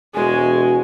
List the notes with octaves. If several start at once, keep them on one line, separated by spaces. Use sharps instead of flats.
E1 G#3 F#4 G#5